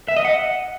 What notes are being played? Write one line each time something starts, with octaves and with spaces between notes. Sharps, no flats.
E5
D#5
F#5